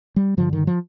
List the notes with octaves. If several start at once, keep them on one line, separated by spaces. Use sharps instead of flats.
G3
G2 D3 F3
D#3
F3